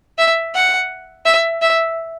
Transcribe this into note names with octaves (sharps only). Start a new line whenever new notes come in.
E5
F#5
E5
E5